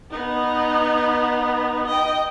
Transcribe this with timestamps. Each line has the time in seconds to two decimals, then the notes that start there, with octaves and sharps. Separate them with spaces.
0.10 B3 D#4
1.87 D#5 G5